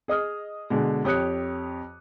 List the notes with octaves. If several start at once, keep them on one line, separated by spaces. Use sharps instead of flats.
G#4 D#5 D#6 F6
B2 D3 G#3
F2 G4 C#5 D#6 F#6 C#7